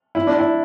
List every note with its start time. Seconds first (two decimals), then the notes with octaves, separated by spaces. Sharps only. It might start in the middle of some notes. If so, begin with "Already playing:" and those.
0.15 E4
0.27 D4
0.39 E4